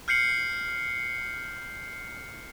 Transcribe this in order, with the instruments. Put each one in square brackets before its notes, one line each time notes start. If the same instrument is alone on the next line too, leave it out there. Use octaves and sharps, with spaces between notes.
[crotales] F6 G6 C7 C#7 F#7